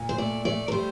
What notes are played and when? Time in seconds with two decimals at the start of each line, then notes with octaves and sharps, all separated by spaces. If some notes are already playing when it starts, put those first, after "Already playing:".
Already playing: A#2
0.09 C5
0.18 A3 D5
0.45 A3 D5
0.68 A#4
0.72 G3 C5